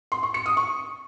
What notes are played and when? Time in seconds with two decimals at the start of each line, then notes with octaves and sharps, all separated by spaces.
0.12 C6
0.23 C#6
0.34 C#7
0.46 D#6
0.57 C#6